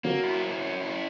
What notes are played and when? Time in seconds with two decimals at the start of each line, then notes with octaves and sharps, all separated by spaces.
0.04 F#3 A#3
0.23 E4
0.43 F#3
0.61 C#4
0.81 E4